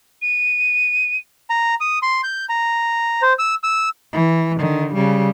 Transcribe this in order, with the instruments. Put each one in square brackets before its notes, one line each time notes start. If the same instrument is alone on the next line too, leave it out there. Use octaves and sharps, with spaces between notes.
[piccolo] D#7
[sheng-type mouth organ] A#5
D#6
C6
G6
A#5
C5
E6
E6
[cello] E3
D3 D#3
C#3 G3